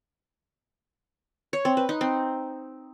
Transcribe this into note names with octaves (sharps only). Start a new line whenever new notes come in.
C#5
C4
B4
D#4
C4